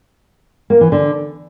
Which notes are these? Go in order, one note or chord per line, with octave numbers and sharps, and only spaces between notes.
A#3
E3
D3